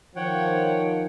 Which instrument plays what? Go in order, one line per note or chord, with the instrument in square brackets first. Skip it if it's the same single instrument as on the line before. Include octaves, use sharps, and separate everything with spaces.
[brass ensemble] D#3 F3 [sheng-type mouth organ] C#5 F#5 G5